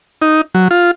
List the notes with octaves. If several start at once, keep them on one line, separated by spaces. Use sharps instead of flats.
D#4
F#3
F4